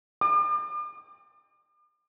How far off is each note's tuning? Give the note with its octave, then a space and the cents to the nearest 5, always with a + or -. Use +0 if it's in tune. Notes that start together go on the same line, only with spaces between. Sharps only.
D6 +45